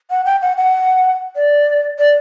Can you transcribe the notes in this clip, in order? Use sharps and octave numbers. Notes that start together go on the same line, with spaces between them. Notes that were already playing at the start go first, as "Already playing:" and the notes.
F#5
G5
F#5
F#5
D5
D5